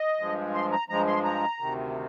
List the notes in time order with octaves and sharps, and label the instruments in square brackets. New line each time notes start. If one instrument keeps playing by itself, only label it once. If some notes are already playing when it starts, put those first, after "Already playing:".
Already playing: [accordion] D#5
G2 F3 G#3
C6
A#5
G2 F3 G#3 A#5
C6
A#5
D2 C3 D#3